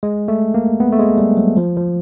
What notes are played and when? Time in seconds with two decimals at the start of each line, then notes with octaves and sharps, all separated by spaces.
0.03 G#3
0.28 A3
0.54 A#3
0.80 B3
0.92 A3
0.99 G#3
1.18 G3
1.37 F#3
1.57 F3
1.77 F3